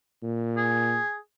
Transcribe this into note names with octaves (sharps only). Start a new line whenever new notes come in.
A#2
G#4